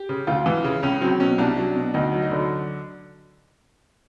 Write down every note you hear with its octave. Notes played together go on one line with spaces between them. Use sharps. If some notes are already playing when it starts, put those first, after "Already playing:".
Already playing: G4
C#3
D2 F4
E3
C#3
C#2 C#4
F#3 C4
B2 C#4
C2 D4
F#3
B2
D2 D#4
F#3
D#4
D3